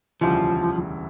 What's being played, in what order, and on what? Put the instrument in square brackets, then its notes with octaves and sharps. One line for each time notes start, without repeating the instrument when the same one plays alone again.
[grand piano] E1 D2 C#3 E3 G3 [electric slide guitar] F3